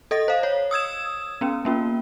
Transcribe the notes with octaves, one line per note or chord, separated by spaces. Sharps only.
A4 D#5 A#6
C5 F5
C#5
D#6 E6 G#6 E7
B3 C#4
A#3 C#4 F4